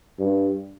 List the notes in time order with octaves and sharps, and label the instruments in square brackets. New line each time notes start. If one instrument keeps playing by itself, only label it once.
[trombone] G2